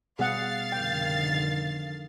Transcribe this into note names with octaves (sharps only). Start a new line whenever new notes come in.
B2 G3 B3 G#4 F5 F#5 A6 C7
F1 D3 D#3 G5